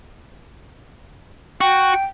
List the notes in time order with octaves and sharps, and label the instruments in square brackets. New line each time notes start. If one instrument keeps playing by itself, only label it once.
[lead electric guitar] F#4 [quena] G5